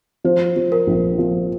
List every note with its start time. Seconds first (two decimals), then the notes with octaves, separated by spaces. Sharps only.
0.24 F3 C5
0.56 F3
0.72 A#4
0.87 A#1
1.18 F3